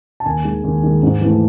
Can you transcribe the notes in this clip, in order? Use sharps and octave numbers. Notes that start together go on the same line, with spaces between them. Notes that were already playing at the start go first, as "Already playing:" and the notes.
A5
D#2 G#5
D#3 G#3
D#2
D#3 G#3
G#2
E3 A3